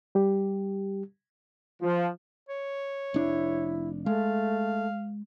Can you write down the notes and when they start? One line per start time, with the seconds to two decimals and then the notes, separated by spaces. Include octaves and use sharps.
0.15 G3 G4
1.82 F3
2.49 C#5
3.14 F1 D4 E4
4.06 G#3 A3 F5